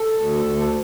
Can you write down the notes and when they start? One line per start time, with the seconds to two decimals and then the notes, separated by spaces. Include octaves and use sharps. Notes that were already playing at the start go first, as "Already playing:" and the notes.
Already playing: A4
0.18 D2
0.45 D2